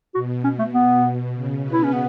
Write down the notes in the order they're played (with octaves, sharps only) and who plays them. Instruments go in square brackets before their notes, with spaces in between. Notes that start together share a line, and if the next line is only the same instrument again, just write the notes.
[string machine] B2 [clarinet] F#4
[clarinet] C#4
A3
B3
[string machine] C#3
B2 B3
[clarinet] E4
C#4
B3